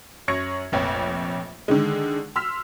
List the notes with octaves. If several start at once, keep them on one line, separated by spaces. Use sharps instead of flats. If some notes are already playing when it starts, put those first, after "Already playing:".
F#2 C#5 C#6 G#6 A#6 C#7
F1 A#1 F2 C#5
D3 D#3 G#3
C6 E6 F6 B6